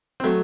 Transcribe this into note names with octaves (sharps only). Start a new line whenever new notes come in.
C4
F#3 A3